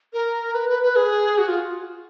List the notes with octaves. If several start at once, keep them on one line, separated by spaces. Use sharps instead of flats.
A#4
B4
B4
B4
G#4
F#4
F4